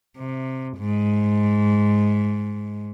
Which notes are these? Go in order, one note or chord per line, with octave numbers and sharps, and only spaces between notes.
C3
G#2